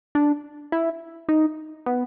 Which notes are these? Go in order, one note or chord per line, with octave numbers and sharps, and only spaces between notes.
D4
E4
D#4
B3